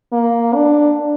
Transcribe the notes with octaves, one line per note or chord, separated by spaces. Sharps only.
A#3
D4